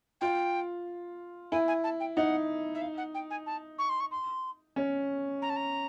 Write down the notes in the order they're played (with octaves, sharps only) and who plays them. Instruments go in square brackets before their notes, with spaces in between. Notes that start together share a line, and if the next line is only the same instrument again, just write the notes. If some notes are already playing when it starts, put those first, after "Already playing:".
[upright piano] F4 [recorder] G5
[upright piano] E4 [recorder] G#5
[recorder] G#5
A5
G5
[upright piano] D#4 [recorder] F#5
[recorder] E5
F5
F#5
G5
G#5
A5
C#6
C6
C#6
C6
[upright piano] C#4
[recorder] A#5
A5
A#5